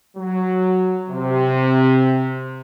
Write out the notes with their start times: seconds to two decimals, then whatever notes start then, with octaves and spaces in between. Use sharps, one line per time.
0.16 F#3
1.10 C3